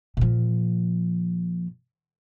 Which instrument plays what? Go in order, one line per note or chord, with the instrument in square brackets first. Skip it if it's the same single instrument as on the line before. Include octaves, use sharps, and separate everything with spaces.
[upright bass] A#2 F3